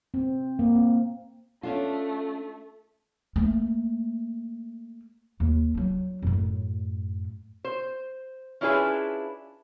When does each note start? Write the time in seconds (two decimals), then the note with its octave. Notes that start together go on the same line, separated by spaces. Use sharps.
0.14 C4
0.59 A#3
0.75 C4
1.63 A3 C#4 D4 F4
3.36 A3 A#3
5.40 D#2
5.75 F#3 D4
6.22 F#2 A2
7.65 C5
8.61 C#4 D4 E4 F4 G#4 B4